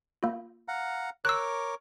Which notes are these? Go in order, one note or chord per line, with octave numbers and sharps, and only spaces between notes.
A#3 F4
F5 F#5 A#5
A#4 C#5 D6 E6 F#6